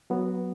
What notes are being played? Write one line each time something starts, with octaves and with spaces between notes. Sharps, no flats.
F#3 B3 F#4